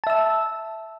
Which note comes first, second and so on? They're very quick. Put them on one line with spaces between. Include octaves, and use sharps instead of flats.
A5 E5 E6